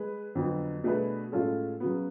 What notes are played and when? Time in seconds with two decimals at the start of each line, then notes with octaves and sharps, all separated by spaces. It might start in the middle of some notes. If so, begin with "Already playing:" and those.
Already playing: G#3 B4
0.35 F2 D3 F#3 B3
0.84 B2 A3 D4 G#4 B4
1.32 A2 G#3 C#4 F4 A4
1.80 C#3 F#3 B3